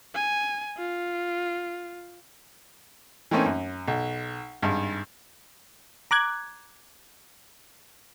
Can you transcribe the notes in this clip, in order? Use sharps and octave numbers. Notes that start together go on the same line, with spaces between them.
G#5
F4
E3 A3 A#3 C4 C#4 D#4
F#2
B1
G#1 G2
A#5 D6 F#6 G#6